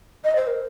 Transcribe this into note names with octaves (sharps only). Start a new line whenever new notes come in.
D#5
C5
A#4